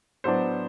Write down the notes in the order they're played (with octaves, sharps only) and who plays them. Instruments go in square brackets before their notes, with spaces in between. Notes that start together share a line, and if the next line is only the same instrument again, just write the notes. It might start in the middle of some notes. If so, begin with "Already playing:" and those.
[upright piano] A2 F#3 B3 D4 C5